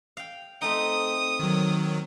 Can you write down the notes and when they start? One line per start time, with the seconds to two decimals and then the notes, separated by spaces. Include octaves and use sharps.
0.17 F5 G5
0.62 A3 C4 D#4 D#6
1.40 D#3 F#3